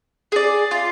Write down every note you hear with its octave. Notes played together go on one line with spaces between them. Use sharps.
G#4 D5
F4